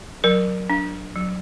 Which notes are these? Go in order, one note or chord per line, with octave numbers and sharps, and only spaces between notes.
F#3 A#4
D4
F#3